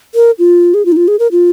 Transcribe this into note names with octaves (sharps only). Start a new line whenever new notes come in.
A#4
F4
G#4
F4
D#4
F4
G#4
A#4
F4